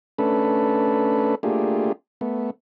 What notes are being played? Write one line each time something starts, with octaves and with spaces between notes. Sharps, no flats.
A3 C#4 D4 A4 B4
A3 A#3 D4 F4 G4 G#4
A3 B3